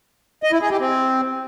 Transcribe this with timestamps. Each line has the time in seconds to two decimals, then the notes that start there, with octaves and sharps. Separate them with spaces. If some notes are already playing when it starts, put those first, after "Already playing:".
0.43 D#5
0.52 E4
0.61 G#4
0.71 G4
0.80 C4